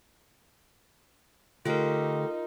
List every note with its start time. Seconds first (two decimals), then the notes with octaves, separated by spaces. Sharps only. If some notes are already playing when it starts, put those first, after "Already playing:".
1.65 D3 A3 D#4 F4 G4 A#4